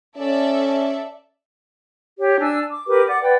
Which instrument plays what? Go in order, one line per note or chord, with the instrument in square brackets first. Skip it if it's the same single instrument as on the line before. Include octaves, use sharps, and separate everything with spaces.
[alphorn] C#4 [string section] A4 D5 E5
[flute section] G4 C#5
D4 G#5 E6
D6
G4 A#4 B4 D6
D5 F#5 D6
B4 D5 F#5 G5